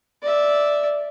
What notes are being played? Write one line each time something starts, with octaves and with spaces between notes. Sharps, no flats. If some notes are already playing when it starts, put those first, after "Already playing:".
D5 E5